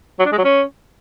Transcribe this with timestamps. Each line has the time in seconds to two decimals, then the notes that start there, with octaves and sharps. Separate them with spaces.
0.19 F#3
0.26 D4
0.32 G#3
0.38 F#3
0.44 C#4